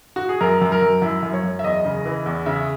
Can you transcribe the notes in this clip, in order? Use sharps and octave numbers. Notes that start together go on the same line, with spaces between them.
F#4
G#4
F#2 A#4
F#2
A#4
F#2
F#2 E4
F#2
C#5
F#2
E5
E2 D#5
C#3
E3
E2
C#3 E5